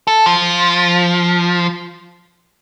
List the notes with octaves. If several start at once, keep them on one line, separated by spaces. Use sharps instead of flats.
A4
F3